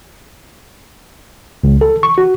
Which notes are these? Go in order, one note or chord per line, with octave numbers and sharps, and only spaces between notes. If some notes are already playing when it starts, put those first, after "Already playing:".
C#2
A4
C#6
F#4